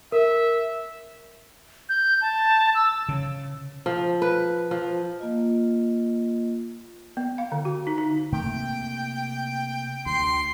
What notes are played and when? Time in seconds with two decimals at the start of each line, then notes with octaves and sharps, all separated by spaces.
0.12 A#4 E5
1.89 G6
2.21 A5
2.75 E6
3.09 C#3
3.86 F3
4.22 B4
4.71 F3
5.19 A#3 F4 D#5
7.17 B3
7.38 F5
7.52 D3
7.65 F#4
7.87 D#4
7.98 D#4
8.32 C3 A3 A#3 G5
10.06 D2 C6